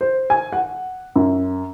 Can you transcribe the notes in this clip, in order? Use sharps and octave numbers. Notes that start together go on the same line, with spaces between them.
C5
G#5
F#5
F#2